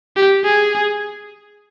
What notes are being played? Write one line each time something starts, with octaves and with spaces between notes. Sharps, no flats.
G4
G#4